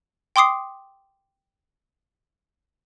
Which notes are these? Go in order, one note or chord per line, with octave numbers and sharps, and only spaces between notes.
G5 C6 D6 D#6 C7